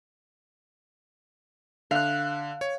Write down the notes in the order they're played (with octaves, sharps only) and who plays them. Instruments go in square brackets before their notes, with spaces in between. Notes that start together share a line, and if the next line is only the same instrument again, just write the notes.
[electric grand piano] D3 [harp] F5 F#6
[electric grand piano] C#5